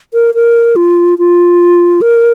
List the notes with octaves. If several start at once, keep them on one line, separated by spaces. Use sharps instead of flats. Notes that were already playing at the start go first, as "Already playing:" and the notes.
A#4
A#4
F4
F4
A#4